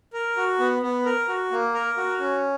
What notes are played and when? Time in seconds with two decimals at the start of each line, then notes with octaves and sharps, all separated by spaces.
0.13 A#4
0.37 F#4
0.59 B3
0.83 B3
1.05 A#4
1.28 F#4
1.51 A#3
1.74 A#4
1.97 F#4
2.19 C#4